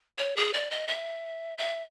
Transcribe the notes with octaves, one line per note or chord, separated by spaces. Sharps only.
C#5
G#4
D5
D#5
E5
E5